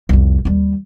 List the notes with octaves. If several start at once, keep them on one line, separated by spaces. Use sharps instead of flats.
C2 F2
D#2 G3